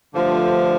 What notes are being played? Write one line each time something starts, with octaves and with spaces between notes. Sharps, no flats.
G2 D3 F3 A3